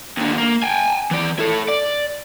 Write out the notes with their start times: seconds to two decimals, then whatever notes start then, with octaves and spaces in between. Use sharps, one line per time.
0.17 D#2 D3
0.38 A#3
0.63 G5 G#5
1.11 E3 D5
1.39 E4 A4
1.68 D5